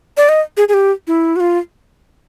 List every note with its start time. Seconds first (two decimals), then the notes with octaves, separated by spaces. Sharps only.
0.17 D5
0.29 D#5
0.57 G#4
0.68 G#4
0.74 G4
1.07 E4
1.36 F#4
1.40 F4